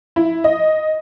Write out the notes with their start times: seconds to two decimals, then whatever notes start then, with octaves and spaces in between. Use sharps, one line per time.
0.16 E4
0.44 D#5